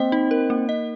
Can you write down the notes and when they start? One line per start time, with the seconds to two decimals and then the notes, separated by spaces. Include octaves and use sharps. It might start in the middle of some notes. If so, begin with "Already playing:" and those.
Already playing: A#3 C4 D#5
0.12 D#4
0.31 A#4
0.50 A#3
0.69 D#5